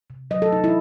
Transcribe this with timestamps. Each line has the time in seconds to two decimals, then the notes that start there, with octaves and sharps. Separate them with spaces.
0.10 C3
0.31 F#3 D#5
0.42 A4
0.52 C3 D#4
0.64 E4